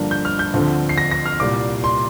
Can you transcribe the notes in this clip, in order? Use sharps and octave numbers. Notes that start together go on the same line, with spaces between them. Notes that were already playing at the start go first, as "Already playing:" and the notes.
Already playing: G2 D3 F3 A#3 D4
G6
F6
G6
D2 D3 F3 C4
C7
A#6
A#6
F6
C2 A#2 G3 D6
C6